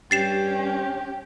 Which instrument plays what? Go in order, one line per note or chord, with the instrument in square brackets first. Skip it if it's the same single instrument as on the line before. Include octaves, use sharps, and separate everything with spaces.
[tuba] G2 [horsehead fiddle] C#4 [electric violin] G4 [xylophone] A6 C7 E7